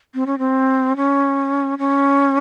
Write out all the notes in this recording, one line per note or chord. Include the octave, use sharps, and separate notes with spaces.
C4
C#4
C4
C#4
C#4